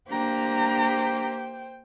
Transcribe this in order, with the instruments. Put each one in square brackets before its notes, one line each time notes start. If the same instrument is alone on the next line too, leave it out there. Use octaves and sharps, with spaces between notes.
[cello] A#3 G4 [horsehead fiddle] D4 A#5 [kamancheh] C5 G5